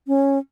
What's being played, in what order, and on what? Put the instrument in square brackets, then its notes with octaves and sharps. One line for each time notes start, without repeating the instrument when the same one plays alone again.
[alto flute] C#4